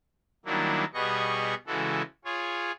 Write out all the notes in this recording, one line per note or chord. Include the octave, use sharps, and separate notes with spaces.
D#3 F#3 G3 A#3 D4 E4
B2 G3 B3 G#4 D#5 C#6
C#3 E3 G#3 F#4 A4
F4 G#4 C#5